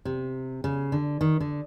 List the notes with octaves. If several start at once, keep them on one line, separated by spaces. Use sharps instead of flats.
C3
C#3
D3
D#3
D3